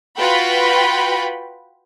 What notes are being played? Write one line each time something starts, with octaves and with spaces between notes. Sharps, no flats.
F4 F#4 B4 G5 B5